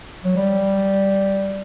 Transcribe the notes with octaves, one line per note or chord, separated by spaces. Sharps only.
F#3
G3